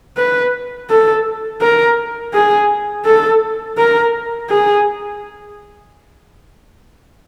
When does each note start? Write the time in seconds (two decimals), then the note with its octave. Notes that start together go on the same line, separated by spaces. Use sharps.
0.18 B4
0.90 A4
1.61 A#4
2.34 G#4
3.06 A4
3.78 A#4
4.50 G#4